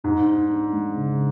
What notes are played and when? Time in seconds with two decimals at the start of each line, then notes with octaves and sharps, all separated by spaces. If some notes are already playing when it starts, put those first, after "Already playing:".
0.04 G#2 D4
0.28 D4
0.50 D4
0.73 G#3
0.96 C#3